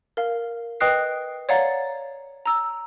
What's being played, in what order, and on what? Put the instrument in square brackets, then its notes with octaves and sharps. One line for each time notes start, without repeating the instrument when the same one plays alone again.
[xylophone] A#4 F5
B4 D#5 G5 D#6 F#6 C7
C#5 D5 F5 F#5 A#5 A6
A#5 E6